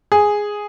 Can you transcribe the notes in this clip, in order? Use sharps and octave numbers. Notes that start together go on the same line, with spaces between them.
G#4